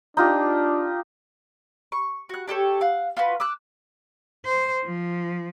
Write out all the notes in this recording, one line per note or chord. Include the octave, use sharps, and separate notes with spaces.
D4 D#4 F4 G4
C#6
F#4 F#6
D4 G4 A4 C#5
F5 F#5
F4 F#4 B4
D6 E6 F#6
C5
F3